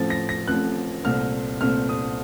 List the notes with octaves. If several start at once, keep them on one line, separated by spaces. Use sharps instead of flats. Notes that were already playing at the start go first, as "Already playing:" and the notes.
Already playing: A1 A2 F3 C4 A6
A#6
A#6
A1 A2 F3 C4 F#6
C2 A#2 A3 C4 F6
C2 A#2 A3 C4 F6
D#6